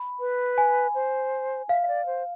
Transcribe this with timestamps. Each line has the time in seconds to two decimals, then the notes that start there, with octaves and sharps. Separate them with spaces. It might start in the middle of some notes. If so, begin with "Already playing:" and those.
Already playing: B5
0.20 B4
0.58 G#5
0.95 C5
1.69 E5 F5
1.82 E5
1.88 D5
2.06 C5